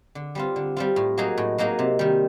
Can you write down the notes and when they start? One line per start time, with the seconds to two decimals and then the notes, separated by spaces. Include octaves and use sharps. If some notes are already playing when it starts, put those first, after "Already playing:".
0.15 D3
0.35 G3 C4 F4
0.56 D3
0.76 G3 C4 F4
0.96 A2
1.18 F#3 A#3 D#4 G#4
1.38 A2
1.58 F#3 A#3 D#4 G#4
1.79 C3
1.99 D#3 G3